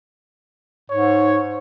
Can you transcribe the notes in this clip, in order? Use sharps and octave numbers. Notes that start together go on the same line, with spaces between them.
G#2 C#5